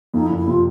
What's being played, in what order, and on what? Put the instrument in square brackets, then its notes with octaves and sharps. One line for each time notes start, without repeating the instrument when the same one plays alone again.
[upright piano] F2 [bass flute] D#4
[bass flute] E4
[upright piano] F#1
[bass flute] E4
[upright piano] C3 [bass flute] F4